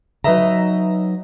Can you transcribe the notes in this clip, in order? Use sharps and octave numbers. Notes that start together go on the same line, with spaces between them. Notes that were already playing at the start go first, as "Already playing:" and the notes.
F#3 D#4 B4 D#5 E5 A#5